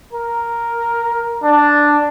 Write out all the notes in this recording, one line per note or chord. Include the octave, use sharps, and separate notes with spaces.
A#4
D4